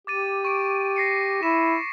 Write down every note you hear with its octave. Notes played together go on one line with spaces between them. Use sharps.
G4 D6 A6 D#7
C#6 D7
A#6 C7 C#7
E4 B6 E7